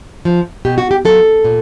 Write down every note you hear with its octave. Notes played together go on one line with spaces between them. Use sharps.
F3
B2 G4
F#4
G4
F#3 A4
A#2